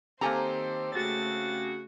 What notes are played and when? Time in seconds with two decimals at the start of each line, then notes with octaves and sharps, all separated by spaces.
0.21 D#3 A#3 C4 G4 A4 C5 G#5 A#5
0.95 C#3 A3 F#4 A6